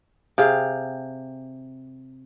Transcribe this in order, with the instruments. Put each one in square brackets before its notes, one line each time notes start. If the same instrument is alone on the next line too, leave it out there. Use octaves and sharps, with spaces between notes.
[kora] C3 G#4 F5 G5